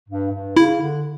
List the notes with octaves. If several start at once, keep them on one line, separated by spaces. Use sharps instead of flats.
G2
G2
C#3 E4
D3